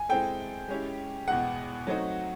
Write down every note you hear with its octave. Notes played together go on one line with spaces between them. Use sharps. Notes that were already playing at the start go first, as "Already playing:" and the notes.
Already playing: G#5
G#3 C4 E4 A4 G5
G#3 C#4 E4 G4
E2 B2 G#3 F#5
F#3 A3 C4 D#4 F#4